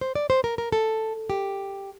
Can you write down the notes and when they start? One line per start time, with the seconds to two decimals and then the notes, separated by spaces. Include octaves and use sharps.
0.01 C5
0.15 D5
0.30 C5
0.44 A#4
0.58 A#4
0.72 A4
1.30 G4